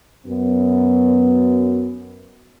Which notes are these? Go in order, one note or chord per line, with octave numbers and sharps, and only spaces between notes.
F#2 B3